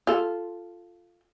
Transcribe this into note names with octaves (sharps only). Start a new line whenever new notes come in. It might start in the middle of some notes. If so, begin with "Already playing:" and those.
F4 A4